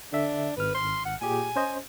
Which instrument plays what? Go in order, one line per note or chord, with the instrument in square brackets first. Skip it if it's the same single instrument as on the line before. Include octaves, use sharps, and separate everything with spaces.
[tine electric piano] D3 E5 [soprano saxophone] D4
[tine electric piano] G#1 F6 [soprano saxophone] B4
[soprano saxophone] C6
F#5
[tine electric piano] A#2 G4 G#4 [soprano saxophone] G#5
[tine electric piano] C#4 C5 D#5